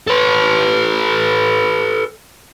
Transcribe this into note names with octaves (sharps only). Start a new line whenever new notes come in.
A4 B4